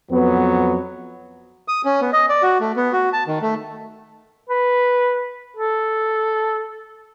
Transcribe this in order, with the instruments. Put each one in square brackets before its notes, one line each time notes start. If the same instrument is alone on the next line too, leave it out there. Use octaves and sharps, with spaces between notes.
[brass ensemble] F2 F#3 B3
[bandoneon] D#6
C#4
B3
D#5
D5
F#4
A3
B3
F#4
A5
D#3
A3
[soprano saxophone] B4
A4